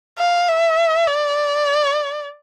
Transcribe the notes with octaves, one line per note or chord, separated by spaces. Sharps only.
F5
E5
D5